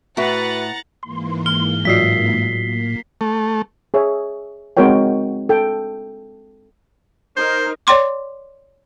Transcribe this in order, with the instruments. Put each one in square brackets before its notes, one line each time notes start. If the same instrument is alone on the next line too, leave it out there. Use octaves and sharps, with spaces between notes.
[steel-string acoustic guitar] A2 [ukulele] F#4 E5 [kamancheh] B4 [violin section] F#5 A#5 A6
[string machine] G#2 E3 A#3 [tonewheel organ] C6
[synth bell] F6 [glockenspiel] G7
[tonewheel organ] A2 [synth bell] F#3 F4 F#4 [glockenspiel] B6 C7
[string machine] A#3
[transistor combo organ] A3
[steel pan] G#4 C#5 E5
G#3 C4 F#4 A#4 C#5 G5
A4 G5
[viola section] D#4 A#4 [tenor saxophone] C5
[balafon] C#5 D5 G5 C6 D6